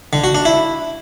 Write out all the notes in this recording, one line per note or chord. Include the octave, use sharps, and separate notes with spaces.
D3
F#4
D4
E4